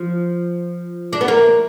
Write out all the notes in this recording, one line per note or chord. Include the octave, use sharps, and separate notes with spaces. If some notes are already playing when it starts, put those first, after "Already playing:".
Already playing: F3
D4
B3
A#3